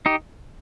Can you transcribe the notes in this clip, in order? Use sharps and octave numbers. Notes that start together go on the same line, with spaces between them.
D#4 G4